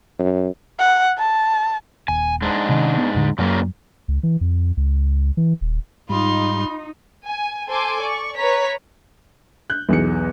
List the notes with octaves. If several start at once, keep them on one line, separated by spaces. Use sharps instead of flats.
F#2
F#5
A5
D#1 G#5
G#2 G#3 D4
C3 D#3 C#4
B3
E2 A2 D3
F#2 A#2 C#3 F#3 A#3
C#2
E3
F2
C#2
E3
D#1
G#2 G3 D#4 F4 B5 C6
G#5
A4 C5 G#5 C6 D6
D5 C#6
B4 C#5 A#5 B6
F#6 G6
B1 E2 G#4 C#7